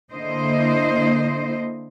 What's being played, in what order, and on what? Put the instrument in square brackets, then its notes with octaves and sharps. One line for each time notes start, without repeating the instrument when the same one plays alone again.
[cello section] D3 A#3 E4 C5 D#5